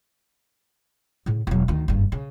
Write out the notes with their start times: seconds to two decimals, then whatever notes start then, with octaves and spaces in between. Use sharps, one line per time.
1.26 A2 C#3
1.47 E1 F#3
1.68 D2 D#3
1.88 F#1 G2
2.12 C#3